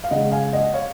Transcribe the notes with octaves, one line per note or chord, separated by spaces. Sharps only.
F5
C#3 G#3 D#5 F#5
F5 G#5
D#5 F#5
C#5 F5